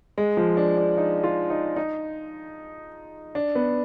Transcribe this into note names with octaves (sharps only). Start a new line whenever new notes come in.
G#3
F3
D4
D4
D#4
F4
D#4
D#4
D4
B3